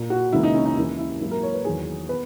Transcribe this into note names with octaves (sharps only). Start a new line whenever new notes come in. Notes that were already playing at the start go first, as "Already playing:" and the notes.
Already playing: A#2 A#3
F#4
C#2 C#3 E3 A#3 E4
D#4
C#4
D#4
D#2 C#3 E3 E4
E4
G#2 F#3 A#3 E4
A#4
C#5
B4
E2 D#3 F#3 B3 G#4
B3 B4